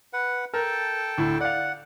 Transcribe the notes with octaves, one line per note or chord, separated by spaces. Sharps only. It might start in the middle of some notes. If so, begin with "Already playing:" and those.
B4 F#5
A4 A#4 G5 A5
D2 A2
D5 F5 F#5